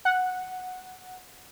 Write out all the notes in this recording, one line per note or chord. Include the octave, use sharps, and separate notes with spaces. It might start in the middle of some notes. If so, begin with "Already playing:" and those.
F#5